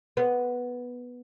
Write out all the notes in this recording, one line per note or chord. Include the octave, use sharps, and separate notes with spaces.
B3